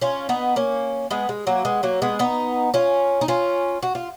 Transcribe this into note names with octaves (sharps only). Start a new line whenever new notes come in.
C#4 F4
B3 D#4
A#3 C#4
G#3 B3
G#3
F#3 A#3
G#3 B3
F#3 A#3
G#3 B3
B3 D#4
C#4 F4
D#4
C#4 F4
F#4
F4